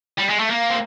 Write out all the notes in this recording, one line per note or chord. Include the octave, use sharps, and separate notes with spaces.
G3
G#3
A3
A#3
C4